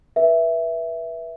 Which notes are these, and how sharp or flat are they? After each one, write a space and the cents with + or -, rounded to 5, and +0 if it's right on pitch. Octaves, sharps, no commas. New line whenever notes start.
B4 -25 E5 +0